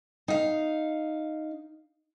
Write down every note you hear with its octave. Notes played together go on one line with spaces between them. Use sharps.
D#4 F5